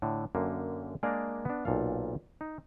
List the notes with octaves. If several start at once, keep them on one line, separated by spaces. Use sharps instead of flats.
A2 D3
F#2 D3 A#3
G#3 A#3 D4 G#4 A#4 D5
B3 D4
B1 A#2 A4 F5
D#4